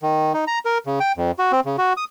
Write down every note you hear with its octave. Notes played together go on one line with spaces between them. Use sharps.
D#3
D#4
A#5
A#4
C#3
G5
F2
F#4
C4
C#3
F#4
D#6